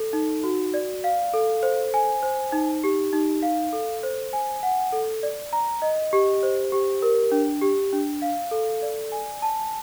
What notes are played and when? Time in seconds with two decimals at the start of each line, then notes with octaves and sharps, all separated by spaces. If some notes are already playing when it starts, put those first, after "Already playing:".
Already playing: A4
0.13 D#4
0.44 F#4
0.74 D5
1.04 F5
1.34 A4
1.63 C5
1.94 G#5
2.23 C5
2.52 D#4
2.84 G4
3.13 D#4
3.42 F5
3.73 A4
4.03 C5
4.33 G#5
4.63 F#5
4.92 A4
5.23 D5
5.53 A#5
5.82 D#5
6.13 G4
6.43 C5
6.72 G4
7.02 A#4
7.32 D4
7.61 G4
7.93 D4
8.22 F5
8.51 A4
8.82 D5
9.12 G#5
9.42 A5